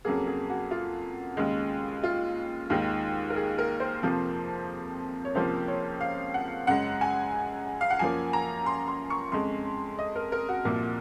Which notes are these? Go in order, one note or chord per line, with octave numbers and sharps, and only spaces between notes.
F2 C#3 F#3 A#3 G#4
G#4
F#4
F4
D#2 C#3 G#3
F4
D#2 D#3 G#3
A#4
G#4
A#4
C5
F2 C3 F3 A#3
C#5
C#2 C3 F3 A#3 C5
C#5
F5
F#5
F#2 C#3 G#3 F#5
G#5
F5
F#5
F#2 F3 A#3 G#5
A#5
C6
C6
C#6
F2 C#3 G#3 C6
D#5
A#4
A#4
F#4
C2 A#2 F3 A#3